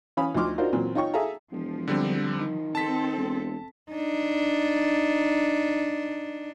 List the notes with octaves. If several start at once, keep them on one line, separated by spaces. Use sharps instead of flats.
E3 C#4 F5 B5 D#6
D2 F3 D#4 C6 D6 F6
D4 D#4 F4 F#4 A#4 C5
A#2 E3 F#3 C4
D#4 F4 C#5 G5 C#6
G#4 A4 E5 F5 A#5
E1 F3
D3 G3 C4
D#3
C4 A4 A5 B6
E1
D4 D#4